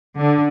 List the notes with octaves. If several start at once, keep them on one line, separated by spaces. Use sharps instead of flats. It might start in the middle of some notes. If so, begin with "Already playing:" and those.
D3